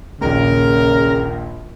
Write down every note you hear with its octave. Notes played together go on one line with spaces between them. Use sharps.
A#1 D#2 C#3 A#4